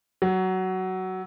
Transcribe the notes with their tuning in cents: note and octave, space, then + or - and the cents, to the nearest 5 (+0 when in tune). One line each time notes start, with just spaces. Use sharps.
F#3 +15